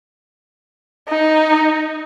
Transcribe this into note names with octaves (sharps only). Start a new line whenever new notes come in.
D#4